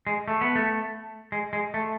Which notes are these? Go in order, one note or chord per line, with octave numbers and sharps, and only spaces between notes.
G#3
A3
B3
A3
G#3
G#3
A3